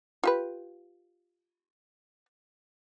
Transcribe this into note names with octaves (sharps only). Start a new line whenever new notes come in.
F4 G4 B4